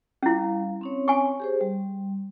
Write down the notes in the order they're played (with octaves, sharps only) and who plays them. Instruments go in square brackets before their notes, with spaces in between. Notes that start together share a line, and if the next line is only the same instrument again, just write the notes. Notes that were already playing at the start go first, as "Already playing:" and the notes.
[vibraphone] G3 F5 [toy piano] C#4 E4
[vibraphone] C4 C#4 C#5
[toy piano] G#5 C#6
[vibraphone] G4 G#4 C5
G3